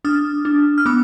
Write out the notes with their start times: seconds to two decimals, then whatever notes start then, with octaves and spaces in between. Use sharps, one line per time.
0.05 D4 D#6 F6
0.45 D4
0.78 F6
0.86 B3 D6 E6